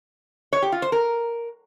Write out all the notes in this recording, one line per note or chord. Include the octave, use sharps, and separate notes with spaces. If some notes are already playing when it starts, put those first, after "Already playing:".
C#5
G4
F4
C5
A#4